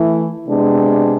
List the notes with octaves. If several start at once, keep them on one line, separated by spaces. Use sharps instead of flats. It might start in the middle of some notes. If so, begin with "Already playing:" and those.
Already playing: E3 A3 E4
C3 G#3 B3 D4